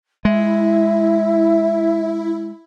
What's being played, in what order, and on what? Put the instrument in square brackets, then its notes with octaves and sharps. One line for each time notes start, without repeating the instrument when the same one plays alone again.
[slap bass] G#3 [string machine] E4 [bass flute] E5